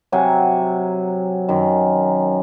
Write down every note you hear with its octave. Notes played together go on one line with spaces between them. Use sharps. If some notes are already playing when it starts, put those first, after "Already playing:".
C3 F#3 F#5 G#5
F#2 D#3